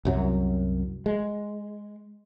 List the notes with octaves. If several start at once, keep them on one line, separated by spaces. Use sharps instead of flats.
C2 F#2 F#3
G#3